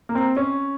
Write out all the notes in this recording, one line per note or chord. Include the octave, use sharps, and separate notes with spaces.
A#3
C4
C#4